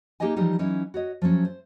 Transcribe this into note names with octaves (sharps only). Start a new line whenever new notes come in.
A#3 D#4 G4 G#4 D#5 G#5
E3 F3 G3 G#3 D#4 G4
E3 F#3 C#4 D#4 E4
F#4 C#5 D#5
F3 F#3 A3 C#4
C5